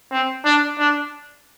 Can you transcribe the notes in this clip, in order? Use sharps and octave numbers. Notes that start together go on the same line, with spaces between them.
C4
D4
D4